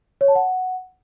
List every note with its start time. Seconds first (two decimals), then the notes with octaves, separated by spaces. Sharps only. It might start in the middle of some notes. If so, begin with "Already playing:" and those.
0.21 C#5
0.28 A5
0.35 F#5